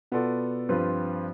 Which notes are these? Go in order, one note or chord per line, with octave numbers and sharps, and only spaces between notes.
B2 B3 F4 A4 D5
G2 F3 C4 F4 B4